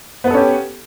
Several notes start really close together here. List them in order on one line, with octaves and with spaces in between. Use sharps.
B3 B4 A4 C#4 G4